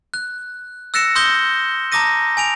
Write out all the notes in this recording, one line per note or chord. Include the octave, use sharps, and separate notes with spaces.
F#6
E6 F#6 A6 A#6 C#7 E7
C6 D#6 E6 G6 A#6 G7
A5 A#5 D6 D#6 A#6 D#7
G#5 D7 F7